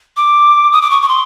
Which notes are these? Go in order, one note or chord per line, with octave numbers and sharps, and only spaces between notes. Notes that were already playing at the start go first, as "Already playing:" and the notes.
D6
D#6
D6
C#6
C#6
C6